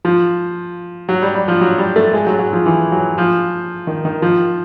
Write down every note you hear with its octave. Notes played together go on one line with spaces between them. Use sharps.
F3
F#3
G3
G3
F3
F#3
G3
A3
G#3
F#3
F#3
F3
E3
F#3
F3
D#3
D#3
F3